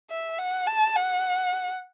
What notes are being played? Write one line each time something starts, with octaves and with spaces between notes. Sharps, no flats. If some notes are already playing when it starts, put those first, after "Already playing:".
E5
F#5
A5
F#5